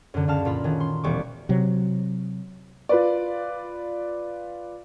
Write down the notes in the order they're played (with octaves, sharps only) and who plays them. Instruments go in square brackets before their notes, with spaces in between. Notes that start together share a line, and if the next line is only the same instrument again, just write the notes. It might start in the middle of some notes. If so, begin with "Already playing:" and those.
[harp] F#2 D3
C#2 F#2 F5 A5 F6
A#2 F4 B5
D#3 C#4 F#4
C6
E1 G3 C#6 D6
[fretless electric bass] C3 F#3
[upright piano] F4 B4 D5